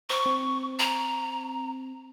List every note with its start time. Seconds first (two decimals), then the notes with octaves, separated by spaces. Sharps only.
0.09 C5 A#5 C#6
0.26 C4
0.79 A#5